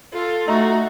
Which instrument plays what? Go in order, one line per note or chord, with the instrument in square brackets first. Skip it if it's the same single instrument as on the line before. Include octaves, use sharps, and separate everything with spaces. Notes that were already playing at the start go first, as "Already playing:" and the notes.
[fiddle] F4 [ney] A4
[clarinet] A3 [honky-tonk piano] D#4 A#5 [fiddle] F#4